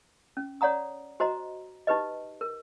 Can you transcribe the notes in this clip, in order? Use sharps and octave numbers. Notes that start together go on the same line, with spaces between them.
C#4
C#5 D5 F#5 A#5 D#6
F#4 C5 D#5 A#5
D#4 G4 B4 D#5
A#4